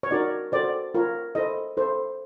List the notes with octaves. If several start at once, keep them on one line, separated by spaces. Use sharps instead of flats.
C#5
D#4 F#4 A#4 D5
F#4 A4 C5 D5
F4 A#4 C#5
E4 A4 C5 D#5
E4 A4 C5